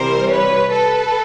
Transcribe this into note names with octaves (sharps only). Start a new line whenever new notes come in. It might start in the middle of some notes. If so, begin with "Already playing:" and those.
Already playing: C3 E3 G3 A#4 C5
B4 C#5
A4 B4